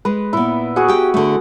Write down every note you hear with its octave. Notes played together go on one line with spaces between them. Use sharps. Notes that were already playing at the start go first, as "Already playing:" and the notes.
G#3 B4
A#2 B3 E4
F#4 G#4 F#5
G4 G5
D3 A3